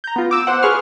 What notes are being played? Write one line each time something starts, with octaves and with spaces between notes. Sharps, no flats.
A#5 G6
B3 F4
D6 E6 E7
C5 F#5
G#4 B4 C6 C#6 F6